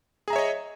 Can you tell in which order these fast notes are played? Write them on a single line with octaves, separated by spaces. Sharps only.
G#4 A#5 E5 C#5 D#5